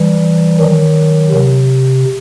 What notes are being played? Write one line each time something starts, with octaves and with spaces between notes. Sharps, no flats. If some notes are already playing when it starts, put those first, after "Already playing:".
Already playing: E3 G3
D#3 F#3
C3